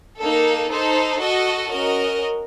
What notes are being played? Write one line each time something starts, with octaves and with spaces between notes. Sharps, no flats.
A#3 D#4 A4
D#4 A4 C5
F#4 A4 D#5
C#4 F#4 A#4 D#5